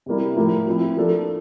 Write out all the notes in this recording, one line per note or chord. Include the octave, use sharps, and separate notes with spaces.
C3 G3 A#3 E4
A2 F3 A#3 E4
F3 C4 E4
F3 A#3 D4 A4